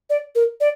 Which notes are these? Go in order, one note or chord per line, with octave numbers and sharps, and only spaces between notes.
D5
A#4
D5